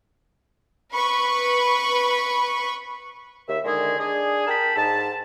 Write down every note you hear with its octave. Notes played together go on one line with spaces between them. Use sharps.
B4 B5 C#6
D#2 E5
D3 D#3 G#3 G#4
D4 G#4
A#4 G5 A5 B5
G#2 A5